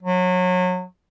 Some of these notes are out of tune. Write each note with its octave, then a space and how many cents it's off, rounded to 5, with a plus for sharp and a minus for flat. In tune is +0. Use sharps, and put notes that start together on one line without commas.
F#3 -25